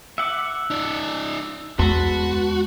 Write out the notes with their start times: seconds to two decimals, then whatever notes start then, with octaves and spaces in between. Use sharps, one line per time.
0.18 E5 F#5 D6
0.71 D#4 D5
1.79 E2 G#3 F#4 B4 A5 C6